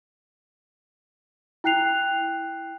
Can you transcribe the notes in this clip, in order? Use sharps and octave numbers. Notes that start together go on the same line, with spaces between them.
E4 G5 F#6 C7 F7